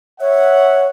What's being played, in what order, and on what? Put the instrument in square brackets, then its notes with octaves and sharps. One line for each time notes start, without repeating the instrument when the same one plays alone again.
[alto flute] C#5 [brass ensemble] E5 F#5